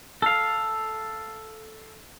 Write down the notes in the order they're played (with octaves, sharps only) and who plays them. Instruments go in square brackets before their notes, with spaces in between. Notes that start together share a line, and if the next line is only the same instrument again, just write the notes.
[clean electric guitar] A4 F5